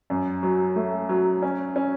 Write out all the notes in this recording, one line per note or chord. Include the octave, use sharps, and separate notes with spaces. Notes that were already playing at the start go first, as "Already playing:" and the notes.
F#2
F#3
A3
F#3
C#4
C#4